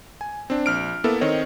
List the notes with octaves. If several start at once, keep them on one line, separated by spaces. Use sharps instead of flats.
G#5
C4 D4
A#1 F6 D7
A#3 B3 E4 A4
D#3 C4 C#5 D#5